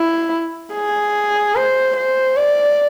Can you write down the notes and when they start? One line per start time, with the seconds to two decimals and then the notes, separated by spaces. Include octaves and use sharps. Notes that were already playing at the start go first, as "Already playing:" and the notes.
Already playing: E4
0.73 G#4
1.55 C5
1.96 C5
2.37 D5